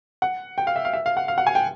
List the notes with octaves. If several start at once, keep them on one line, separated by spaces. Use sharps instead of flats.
F#5
G5
F5
E5
F5
E5
F5
F#5
F5
F#5
G#5
G5